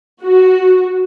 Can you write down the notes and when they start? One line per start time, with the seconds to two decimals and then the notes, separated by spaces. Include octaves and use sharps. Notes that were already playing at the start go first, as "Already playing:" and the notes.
0.22 F#4